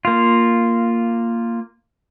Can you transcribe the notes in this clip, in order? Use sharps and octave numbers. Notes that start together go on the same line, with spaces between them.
A#3 F4